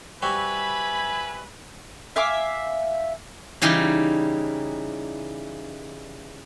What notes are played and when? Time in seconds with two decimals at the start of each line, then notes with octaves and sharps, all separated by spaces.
0.22 G3 C4 F#4 B4 E5 G#5 B5
2.16 E5 F5 G#5 D6
3.62 C#3 E3 G3 D#4